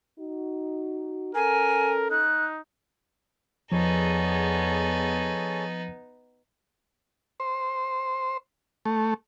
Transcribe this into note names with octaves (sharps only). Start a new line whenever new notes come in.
D#4 F#4
C#4 A4 A#4 G#5
D#4 F#6
E2 F3 B3 D#4 G#4 A4 C#5
C5
A3